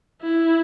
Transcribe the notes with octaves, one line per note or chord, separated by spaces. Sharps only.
E4